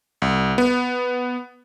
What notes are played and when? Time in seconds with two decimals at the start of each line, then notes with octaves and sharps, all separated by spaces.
0.22 C2
0.58 B3